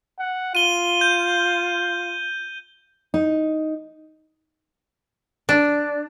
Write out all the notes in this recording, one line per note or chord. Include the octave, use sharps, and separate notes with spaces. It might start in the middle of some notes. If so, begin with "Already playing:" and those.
F#5
F4 D#7 G7
G6
D#4
D4